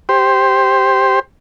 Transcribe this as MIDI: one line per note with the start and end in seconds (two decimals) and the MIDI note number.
0.09 1.19 67
0.09 1.19 72